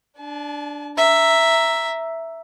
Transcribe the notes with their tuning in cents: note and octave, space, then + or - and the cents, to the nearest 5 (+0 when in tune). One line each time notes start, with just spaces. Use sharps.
D4 +0 A5 -45
E5 +0 A#5 +0